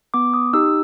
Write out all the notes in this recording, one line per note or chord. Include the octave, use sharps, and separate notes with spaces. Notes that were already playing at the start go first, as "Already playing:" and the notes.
B3 D6
D#6
D#4 G4 E6